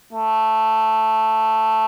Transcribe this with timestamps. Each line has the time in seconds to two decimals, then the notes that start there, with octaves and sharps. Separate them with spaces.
0.13 A3